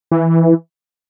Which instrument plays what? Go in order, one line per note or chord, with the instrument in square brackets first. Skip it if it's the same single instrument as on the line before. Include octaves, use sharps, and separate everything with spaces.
[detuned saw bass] E3